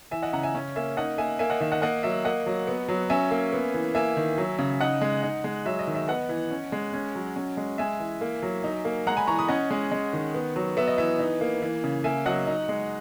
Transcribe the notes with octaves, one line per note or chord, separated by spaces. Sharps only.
E3 E5 G#5
D#5 F#5
C#3 F#5 A#5
E5 G#5
C#4
A#3 E5 G#5
D#4 D#5 F#5
A#3 E5 G#5
A#3 E5 G#5
D#5 F#5
D#3 E5
D#5 F#5
A#3 D#5 F#5
F#3 E5
A#3 D#5 F#5
F#3
B3
F#3
C#4 E5 G#5
A#3
B3
E3
A#3 E5 G#5
D#3
F#3
C#3
D#4 D#5 F#5
G#3
D#4
G#3
F#3 E5
D#5
D#3
E5
B3 D#5 F#5
E3
C#4
G#3
C#4
F#3
C#4
G#3
G#3 E5 G#5
E3
A#3
F#3
D#4
A#3
G#3 F#5 A#5
G#5 B5
E3 A#5 C#6
B5 D#6
C#4 D#5 F#5
G#3
G#3
D#3
B3
F#3
B3 E5
D#5
E3 E5
D#4
A#3
E3
C#3
A#3 E5 G#5
F#3 D#5 F#5
D#4
G#3